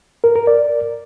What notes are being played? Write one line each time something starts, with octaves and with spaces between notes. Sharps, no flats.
A#4
A#4
D5